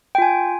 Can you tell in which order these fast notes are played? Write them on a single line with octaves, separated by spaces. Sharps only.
G5 F4 G#5